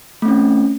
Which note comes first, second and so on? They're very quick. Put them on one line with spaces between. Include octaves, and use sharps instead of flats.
A3 C4 C#4